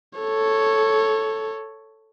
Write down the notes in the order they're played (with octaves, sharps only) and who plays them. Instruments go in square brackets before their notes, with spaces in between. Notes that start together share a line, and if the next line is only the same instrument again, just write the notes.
[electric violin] A4 C#5